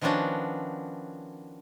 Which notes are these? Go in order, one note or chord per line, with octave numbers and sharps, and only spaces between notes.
D#3 F3 B3 C#4 D4 F#4